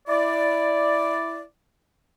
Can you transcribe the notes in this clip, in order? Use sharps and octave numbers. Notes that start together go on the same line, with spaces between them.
E4 D5